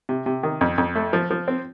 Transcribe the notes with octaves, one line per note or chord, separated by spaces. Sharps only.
C3
C3
D#3
F2
F2
A3
F3
F3
C4